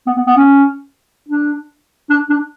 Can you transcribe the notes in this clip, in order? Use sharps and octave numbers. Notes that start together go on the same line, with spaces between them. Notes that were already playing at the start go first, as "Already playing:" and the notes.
B3
B3
B3
C#4
D4
D4
D4